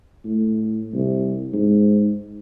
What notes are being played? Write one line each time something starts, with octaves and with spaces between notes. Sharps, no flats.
A2
C2
G#2